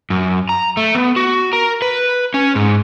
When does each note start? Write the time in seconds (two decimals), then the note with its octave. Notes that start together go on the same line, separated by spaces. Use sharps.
0.10 F#2
0.49 A#5
0.77 A3
0.95 B3
1.16 F#4
1.53 A#4
1.82 B4
2.34 C#4
2.55 G#2